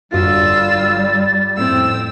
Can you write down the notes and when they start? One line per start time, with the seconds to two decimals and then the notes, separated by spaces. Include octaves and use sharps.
0.12 G1 G3 F4 F#4 F5 E6 A6
1.57 F2 A2 C4 E6